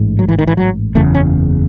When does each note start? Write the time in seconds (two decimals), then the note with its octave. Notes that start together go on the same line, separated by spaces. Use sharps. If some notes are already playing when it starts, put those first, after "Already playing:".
Already playing: A1 G#2
0.19 F#3
0.29 E3
0.39 D#3
0.47 E3
0.57 F#3
0.95 F#1 E2 C#3 A3
1.14 C#4